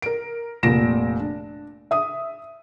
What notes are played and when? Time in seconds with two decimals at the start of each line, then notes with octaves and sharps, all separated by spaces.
0.02 A#4 D7
0.63 F1 A#2 A#6 D7 E7
1.20 D4
1.91 E5 D#6